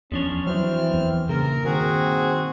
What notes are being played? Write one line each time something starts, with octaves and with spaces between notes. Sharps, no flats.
E2 F3 C#4 D4 C#5
E3 F#3 C4 F6
E2
G2 A#2 C#3 A#4
D#3 C4 F#4 G#4